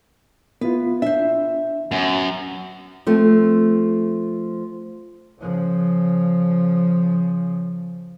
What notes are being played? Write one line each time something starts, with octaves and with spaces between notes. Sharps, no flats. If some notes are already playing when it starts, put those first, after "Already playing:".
B3 E4 F4 B4
D4 C5 E5
F#2 B3
F3 A3 C4
C#3 F3